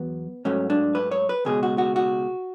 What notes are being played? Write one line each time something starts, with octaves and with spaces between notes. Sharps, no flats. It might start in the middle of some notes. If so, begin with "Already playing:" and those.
Already playing: E2 F#3 B3
G#2 F#3 A3 C#4
D4
B4
C#5
B4
C#2 B2 G#3 G#4
F#4
F#4
F#4